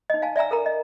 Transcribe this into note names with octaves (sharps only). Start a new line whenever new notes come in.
D#4 D#5
F5 G#5 A5
D5 E5 G#5 A#5 E6
A4 A#4 A#5
D#5